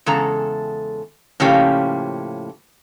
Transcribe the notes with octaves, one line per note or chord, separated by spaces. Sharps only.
E2 C#3 G#3 A4 A#5
A2 C#3 F3 A#3 C#4 G4